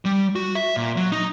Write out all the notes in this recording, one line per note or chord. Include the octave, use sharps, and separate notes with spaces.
G3
F#4
E5
A#2
F#3
D#4